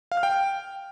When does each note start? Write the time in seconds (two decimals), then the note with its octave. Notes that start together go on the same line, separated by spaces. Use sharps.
0.12 F5
0.17 F6
0.23 G5